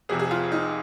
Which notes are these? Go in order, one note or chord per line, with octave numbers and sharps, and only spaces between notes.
F1 F2 C3 G#4
G#4
F4
D#4